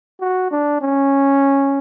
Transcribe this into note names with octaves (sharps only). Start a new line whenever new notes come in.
F#4
D4
C#4